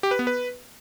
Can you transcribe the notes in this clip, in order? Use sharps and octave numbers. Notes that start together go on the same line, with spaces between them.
G4
B4
B3
B4